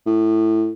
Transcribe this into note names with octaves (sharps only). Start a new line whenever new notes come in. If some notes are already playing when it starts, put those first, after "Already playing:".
A2